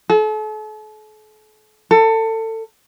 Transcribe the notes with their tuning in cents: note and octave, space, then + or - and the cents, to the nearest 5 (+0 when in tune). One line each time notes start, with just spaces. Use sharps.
A4 -40
A4 +25